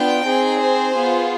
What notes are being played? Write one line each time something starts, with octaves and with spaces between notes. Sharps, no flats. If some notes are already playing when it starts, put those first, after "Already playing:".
Already playing: B3 D4 F4 G5
C4 D#4 G#4
C5
B3 F4 G#4